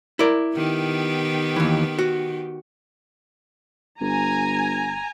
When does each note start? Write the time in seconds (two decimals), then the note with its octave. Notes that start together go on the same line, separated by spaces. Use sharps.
0.19 E4 A#4 D5
0.56 D#3 B3 G4
1.56 D#2 E3
1.99 F#4
4.01 G1 G#5 A#5